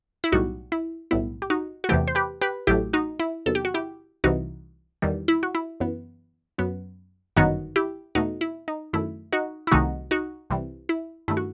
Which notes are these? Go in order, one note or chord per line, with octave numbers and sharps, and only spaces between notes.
E4
B1 A2 G3 D#4 F#4
E4
B1 A2 G3 B3 E4
G4
D#4 F#4
F#4
E2 C3 E3 A3 E4 G4
C5
G4 B4
G4 B4
A1 A2 F#3 A3 E4 G4
D#4 F#4
E4
E2 C3 D#3 F#3 B3 A4
G4
F#4
E4 G4
C2 C3 E3 D#4 F#4
E2 D#3 G3
E4
F#4
E4
F#2 E3 B3
F#2 F#3 B3
G1 F#2 D#3 F#3 B3 D#4 F#4
E4 G4
E2 B2 A3 D#4 F#4
E4
D#4
F#2 D#3 A3 E4
D#4 F#4
E4
C2 C3 D#3 A3 D#4 F#4
D#4 F#4
C2 C3 E3 G3
E4
G2 D#3 A3 E4
F#4